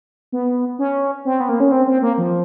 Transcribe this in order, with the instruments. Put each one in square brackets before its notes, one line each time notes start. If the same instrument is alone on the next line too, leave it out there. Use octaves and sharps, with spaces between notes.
[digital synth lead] B3
C#4
C4
B3
A#3
C#4
C4
C4
A#3
F3